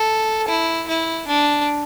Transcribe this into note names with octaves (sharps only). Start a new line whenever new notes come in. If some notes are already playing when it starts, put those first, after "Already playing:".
Already playing: A4
E4
E4
D4